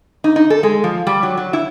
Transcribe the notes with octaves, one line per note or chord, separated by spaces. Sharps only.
D#4
D#4
A4
G#3
F3
G3
F#3
F#3
E4